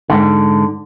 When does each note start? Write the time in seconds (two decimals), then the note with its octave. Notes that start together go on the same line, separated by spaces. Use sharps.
0.10 G#2 D3